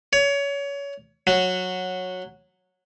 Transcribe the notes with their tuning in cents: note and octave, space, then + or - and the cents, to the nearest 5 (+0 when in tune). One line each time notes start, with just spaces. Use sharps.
C#5 +25
F#3 -10